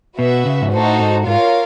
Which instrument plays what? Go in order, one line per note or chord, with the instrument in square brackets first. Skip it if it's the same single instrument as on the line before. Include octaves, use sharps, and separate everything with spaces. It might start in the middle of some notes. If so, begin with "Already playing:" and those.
[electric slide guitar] B2 [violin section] F#4 B4 E5
[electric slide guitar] C#3
G#2
[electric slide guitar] A2 [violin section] D#4 F#4 A4 C5
[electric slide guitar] G#2
[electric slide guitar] G#2 [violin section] F4 A#4 C#5 F5